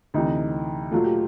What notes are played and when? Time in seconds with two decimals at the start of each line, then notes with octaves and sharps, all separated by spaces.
0.14 D2 C3 E3 D#4
0.91 A#2 F#3 A3 F4
1.04 G4